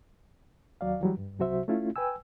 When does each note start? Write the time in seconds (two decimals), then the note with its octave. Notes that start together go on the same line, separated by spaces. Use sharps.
0.81 D#2 F#3 D5 F5
1.01 E3 F#3 G3
1.17 G2
1.39 C2 C3 F#3 F#4 C5 E5
1.68 A3 C#4 E4 F4
1.96 B4 G5 G#5 E6